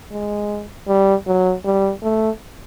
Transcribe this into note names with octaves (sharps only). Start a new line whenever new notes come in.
G#3
G3
F#3
G3
A3